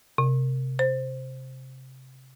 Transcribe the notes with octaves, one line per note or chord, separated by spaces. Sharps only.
C3
C5